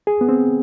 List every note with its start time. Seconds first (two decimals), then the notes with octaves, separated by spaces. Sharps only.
0.07 G#4
0.21 B3
0.29 C4